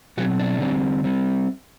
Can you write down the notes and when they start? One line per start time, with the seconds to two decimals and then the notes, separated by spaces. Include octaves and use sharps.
0.17 B2 F#3 C4 F#4
0.39 D4
0.60 D3 G3 C4
1.04 G3 C4